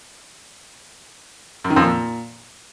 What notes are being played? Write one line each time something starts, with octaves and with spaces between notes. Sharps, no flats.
F#2
D#3
F2
A#2